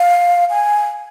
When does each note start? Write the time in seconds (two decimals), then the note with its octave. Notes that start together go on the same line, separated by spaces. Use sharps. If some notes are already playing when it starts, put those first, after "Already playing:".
Already playing: F5
0.50 G#5